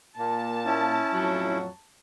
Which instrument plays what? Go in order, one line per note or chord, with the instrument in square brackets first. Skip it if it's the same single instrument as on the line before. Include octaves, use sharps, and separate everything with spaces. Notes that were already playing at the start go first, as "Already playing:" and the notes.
[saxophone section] A#2 A#3 [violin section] A5
[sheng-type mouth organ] C#4 E4
[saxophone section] F2 A2 F#3